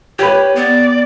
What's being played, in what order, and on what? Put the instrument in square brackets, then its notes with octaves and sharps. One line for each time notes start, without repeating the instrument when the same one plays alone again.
[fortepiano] G4 B4 [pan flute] C#5
[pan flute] B3 [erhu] D5